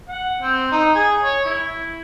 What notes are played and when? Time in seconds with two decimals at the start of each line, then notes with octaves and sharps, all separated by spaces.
0.09 F#5
0.42 C4
0.72 D#4
0.95 G#4
1.23 C#5
1.45 E4